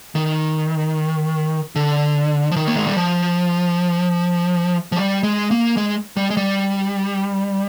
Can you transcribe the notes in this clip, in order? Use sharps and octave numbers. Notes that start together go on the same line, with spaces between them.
D#3
D3
F3
D#3
A#3
G#3
G3
F3
F3
G3
G#3
A#3
G#3
G3
G#3
G3